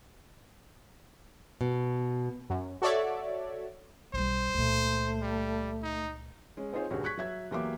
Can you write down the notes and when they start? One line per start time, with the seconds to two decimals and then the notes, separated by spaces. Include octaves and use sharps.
1.61 B2
2.50 F#2
2.82 F#4 A4 C#5 D5 E5
4.14 B1 G3 C5
4.54 C#2 A#2 A3
5.22 G3
5.82 D#4
6.57 G#3 C#4
6.73 C4 D#4 F4 G#4 C5 C#5
6.91 D#1 C#2 G2 C#4 F#4 C#5
7.04 C#6 F#6 G#6 B6
7.17 F#3 E5 G#6
7.51 E2 F#3 A#3 G4 E5 D6